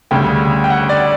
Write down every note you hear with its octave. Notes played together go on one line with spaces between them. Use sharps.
D2 C#3 G3 G5
G5
F#5
D5